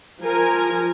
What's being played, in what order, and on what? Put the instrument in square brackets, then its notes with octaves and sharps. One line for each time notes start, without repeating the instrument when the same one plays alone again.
[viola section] F3 A#4 G#5